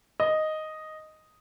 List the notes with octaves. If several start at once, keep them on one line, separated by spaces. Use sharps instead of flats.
D#5